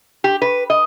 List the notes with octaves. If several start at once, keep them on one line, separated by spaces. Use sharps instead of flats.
G4
B4
D#5